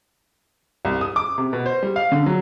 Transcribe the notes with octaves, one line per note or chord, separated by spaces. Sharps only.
C2
D#6
D6
C3
B2
C5
G3
F5
D3
F#3